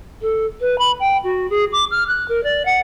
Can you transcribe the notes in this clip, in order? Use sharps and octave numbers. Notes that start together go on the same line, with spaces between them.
A4
B4
B5
G5
F#4
G#4
D6
F6
F#6
A#4
D5
F#5